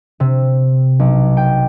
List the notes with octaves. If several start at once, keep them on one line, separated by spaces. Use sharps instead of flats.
C3
B1
G5